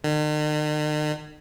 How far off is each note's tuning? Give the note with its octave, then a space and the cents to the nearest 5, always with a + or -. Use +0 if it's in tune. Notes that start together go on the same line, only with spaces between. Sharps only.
D#3 -45